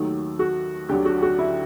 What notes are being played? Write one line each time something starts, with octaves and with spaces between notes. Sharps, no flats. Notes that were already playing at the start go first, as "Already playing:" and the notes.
Already playing: D#2 D#3 F#3 A3
F#4
D2 D3 F#3 G4
F#4
F#4
E4